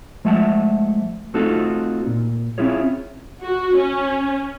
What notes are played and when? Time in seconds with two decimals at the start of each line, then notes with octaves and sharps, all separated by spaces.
0.25 F3 G#3 A3 E5 F#5 A5
1.34 A3 C4 D#4 F4 F#4 A4
2.07 A#2
2.58 C4 C#4 E4 F4 G#4 C#5
3.43 F#4
3.77 C#4